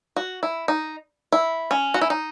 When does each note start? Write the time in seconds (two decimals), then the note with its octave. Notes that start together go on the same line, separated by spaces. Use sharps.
0.16 F#4
0.43 E4
0.68 D#4
1.32 E4
1.71 C#4
1.94 F#4
2.01 E4
2.10 D#4